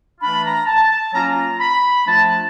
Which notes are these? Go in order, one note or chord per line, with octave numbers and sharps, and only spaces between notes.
E3 A3 D4 F4 B5
A#5
A5
A5
F#3 A#3 C#4 F4 A#5
A5
A#5
B5
F3 A3 D4 F4 A5